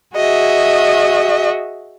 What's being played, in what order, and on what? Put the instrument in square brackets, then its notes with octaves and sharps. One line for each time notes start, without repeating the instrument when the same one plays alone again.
[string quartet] F#4 G#4 D#5 E5